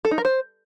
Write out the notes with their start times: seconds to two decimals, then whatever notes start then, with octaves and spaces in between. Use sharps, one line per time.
0.05 A4
0.11 D#4
0.18 A#4
0.25 C5